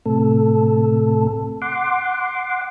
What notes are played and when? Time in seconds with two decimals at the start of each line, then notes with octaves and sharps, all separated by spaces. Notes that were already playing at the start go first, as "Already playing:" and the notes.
0.06 A2 C3 A4
1.62 F#5 C6 D6